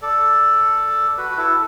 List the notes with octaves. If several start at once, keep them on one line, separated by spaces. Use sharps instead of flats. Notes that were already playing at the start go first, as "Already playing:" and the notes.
A4 D5
F#4 B4
F#4
E4 A4